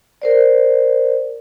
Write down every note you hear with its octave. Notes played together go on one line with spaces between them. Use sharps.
A#4 C5 D5